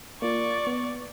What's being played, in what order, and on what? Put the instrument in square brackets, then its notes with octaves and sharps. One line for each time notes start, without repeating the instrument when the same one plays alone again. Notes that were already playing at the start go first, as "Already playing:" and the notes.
[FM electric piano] A#3 F4 [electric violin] D5 C#6
[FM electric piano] B3